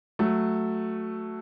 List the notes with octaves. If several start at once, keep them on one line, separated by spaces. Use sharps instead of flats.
F#3 A3